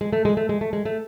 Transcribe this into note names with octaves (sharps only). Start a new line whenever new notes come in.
G#3
A3
G#3
A3
G#3
A3
G#3
A3